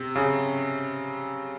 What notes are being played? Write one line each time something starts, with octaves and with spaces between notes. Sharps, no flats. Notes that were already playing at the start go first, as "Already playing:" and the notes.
Already playing: C3
C#3